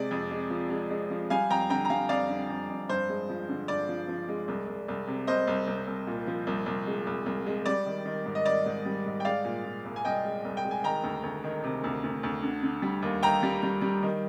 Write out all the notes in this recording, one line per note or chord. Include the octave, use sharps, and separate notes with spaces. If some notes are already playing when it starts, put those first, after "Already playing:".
Already playing: C3 G#3 D5
F2
G#3
F3
G#3
G#3
F3
G3 F5 G#5
F2 G5 A#5
D3 G5 A#5
A#5
G3 F5 G#5
F2 D5 F5
D3
F2
F2
G2 C5
G#3
F3
D3
G2 D5
F3
F3
G#3
C2
C2
C2
C3
C2 C5 D#5
C2
C2
C2
A#2
F3
C2
C2
G#3
C2
C2
G#3
G3 D5
D#3
D#3
G#2
D#5
D#3 D5
G#2
G3
G#2
G5
G#3 D5 F5
A#2
A#2
C2
G#5
C2 D#5 G5
G#3
C2
G5
G#3
G#5
D#3 G5 A#5
D2
D2
D#3
C3
D2
D2
D2
D3
D3
G3
D#2
D#2 G5 A#5
G3
G3
G3
D#3